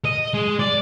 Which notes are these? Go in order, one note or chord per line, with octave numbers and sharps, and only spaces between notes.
D#5
G#3
D5